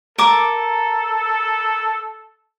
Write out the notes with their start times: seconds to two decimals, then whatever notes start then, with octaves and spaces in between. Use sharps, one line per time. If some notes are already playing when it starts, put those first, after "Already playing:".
0.18 A4 A#4 D6